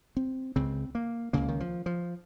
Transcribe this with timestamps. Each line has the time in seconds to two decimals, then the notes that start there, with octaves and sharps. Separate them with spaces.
0.17 C4
0.56 C#2 C#3 C4
0.95 A#3
1.33 C#2 C#3 A#3
1.48 D#3
1.60 F3
1.86 F3